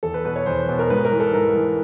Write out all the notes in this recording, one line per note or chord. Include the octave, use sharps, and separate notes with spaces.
E2 A4
B4
B2 B4
C#5
E2 C5
B2
A#4
G#2 B4
A#4
E3
A4
G#2 A#4
E3